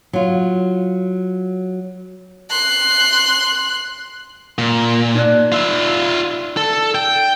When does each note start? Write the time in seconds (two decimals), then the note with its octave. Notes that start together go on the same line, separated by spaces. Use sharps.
0.13 F#3 F4
2.50 C6 F#6
4.58 A#2
5.15 D#4 D5 F#6
5.52 F4 E5
6.57 A4
6.95 G5